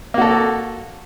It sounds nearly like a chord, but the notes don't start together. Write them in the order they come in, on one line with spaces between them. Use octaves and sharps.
A#3 F#4 A4